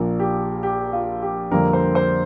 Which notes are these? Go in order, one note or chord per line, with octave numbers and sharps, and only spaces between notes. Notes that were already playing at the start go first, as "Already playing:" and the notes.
Already playing: A#1 A#2 A#3
G4
G4
F4
G4
F2 D3 G3 A#3 A#4
C5
C5